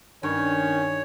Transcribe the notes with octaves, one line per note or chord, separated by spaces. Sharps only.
G2 D#3 C#4 C#5